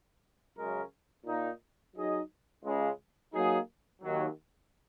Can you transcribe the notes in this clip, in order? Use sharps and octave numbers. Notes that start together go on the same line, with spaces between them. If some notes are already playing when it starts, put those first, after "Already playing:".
F#2 C#3 G#3 C#4 A#4
A#2 A#3 D#4
F#3 D#4 G#4 D#5
C#2 C#3 G#3
F#3 A#3 D#4 G#4
D#2 D#3 F#3